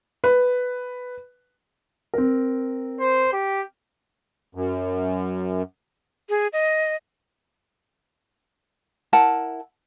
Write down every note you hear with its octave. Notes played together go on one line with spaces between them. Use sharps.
B4
C4 A#4
C5
G4
F#2
G#4
D#5
E4 A#4 F#5 A5